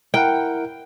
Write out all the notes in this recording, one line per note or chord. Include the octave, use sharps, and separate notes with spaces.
E4 A#4 F#5 G5